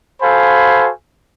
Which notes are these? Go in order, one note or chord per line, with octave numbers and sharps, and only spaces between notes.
F#4 A4 C5 F5 G#5 B5